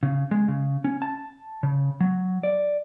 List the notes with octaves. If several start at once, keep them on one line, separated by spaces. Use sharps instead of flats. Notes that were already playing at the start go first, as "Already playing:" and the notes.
C#3
G#3
C#3
C#4
A5
C#3
F#3
D5